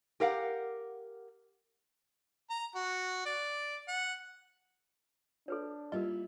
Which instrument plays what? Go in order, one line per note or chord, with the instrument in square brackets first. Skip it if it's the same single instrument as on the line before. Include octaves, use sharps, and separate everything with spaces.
[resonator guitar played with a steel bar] G4 A#4 F5 F#5
[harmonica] A#5
F#4
D5
F#5
[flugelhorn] D4 [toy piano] A4 B4 C#5
[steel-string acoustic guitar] G3 A#3 E4 [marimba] F4 [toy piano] A#4 D#5